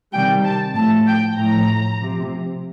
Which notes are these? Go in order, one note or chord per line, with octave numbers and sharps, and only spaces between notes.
C3 D#3 G3 G5
A5
A2 F3 A5
G5
A2 F3 A#5
C3 F3